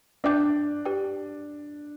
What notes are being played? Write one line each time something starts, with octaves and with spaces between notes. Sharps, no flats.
D4 B4 E5 G5 D6 G6
G4 B4 G5